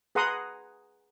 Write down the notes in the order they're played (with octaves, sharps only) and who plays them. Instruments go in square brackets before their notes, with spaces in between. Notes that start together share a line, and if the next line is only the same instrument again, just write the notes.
[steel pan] G#4 B4 F#5 A#5 C6 D#6